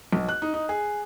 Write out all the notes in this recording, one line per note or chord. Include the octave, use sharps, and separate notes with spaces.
B1
F#6
D#4
D#4
G#4